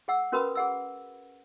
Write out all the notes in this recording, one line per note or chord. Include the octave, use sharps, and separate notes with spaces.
G#4 F#5 E6
C#4 F#4 A#4 B4 B5 D#6
G#4 F#5 E6